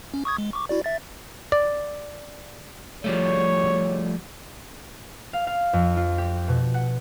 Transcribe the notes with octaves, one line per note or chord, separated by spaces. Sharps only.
C#4
C#6 D#6 G#6
G#3
C#6 D6
E4 F#4 D5
E5 A6
D5
F3 G3 A3 C#5
F5
F5
F2
F4
G4
B2
F#5